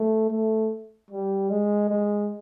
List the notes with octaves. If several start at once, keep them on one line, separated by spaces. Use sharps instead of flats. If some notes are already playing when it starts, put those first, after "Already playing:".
Already playing: A3
A3
G3
G#3
G#3